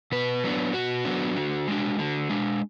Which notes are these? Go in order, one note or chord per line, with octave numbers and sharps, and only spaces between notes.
B2 B4
F#3 B3 D4
B2 F#4
F#3 B3 D4
D3
G#3 D4
D3
G#3 D4